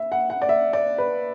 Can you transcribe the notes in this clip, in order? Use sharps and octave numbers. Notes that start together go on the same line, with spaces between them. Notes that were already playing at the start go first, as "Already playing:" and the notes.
Already playing: E5
F#5
F#5
D5
E5
D5
B4